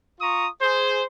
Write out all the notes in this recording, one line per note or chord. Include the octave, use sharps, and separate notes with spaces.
F4 A#5 C#6 D#6
G#4 C5